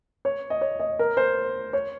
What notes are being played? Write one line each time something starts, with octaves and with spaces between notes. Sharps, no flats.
C#5
D#5
C#5
D#5
A#4
C5
C#5